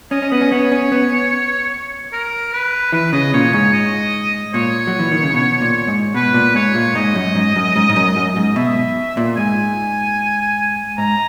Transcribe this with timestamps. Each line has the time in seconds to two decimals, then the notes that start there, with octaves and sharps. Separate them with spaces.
0.11 C#4 D#5
0.22 C#4
0.32 B3 D#5
0.41 C#4
0.51 B3 C#5
0.72 C#4
0.92 B3
2.13 A#4
2.53 B4
2.92 E3 B4
3.13 C#3 D#5
3.33 A#2 C#5
3.53 G#2 C#5
3.73 D#5
4.54 A#2 C#5
4.87 F#3
4.99 E3
5.11 D#3
5.23 C#3
5.34 B2
5.61 A#2
5.87 G#2
6.14 B2 B4
6.34 A#2
6.55 G#2 C#5
6.75 A#2
6.95 G#2 D#5
7.15 F#2
7.35 G#2
7.56 F#2
7.76 G#2
7.90 G#2
7.96 F#2
8.16 F#2
8.36 G#2
8.56 B2 E5
9.17 A#2
9.36 G#2 G#5
10.98 G#2 A#5